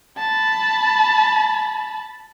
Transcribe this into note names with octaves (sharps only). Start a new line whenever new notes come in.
A5 B5